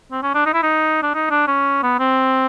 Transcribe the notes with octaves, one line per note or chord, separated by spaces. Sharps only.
C4
C#4
D4
D#4
E4
D#4
D4
D#4
D4
C#4
B3
C4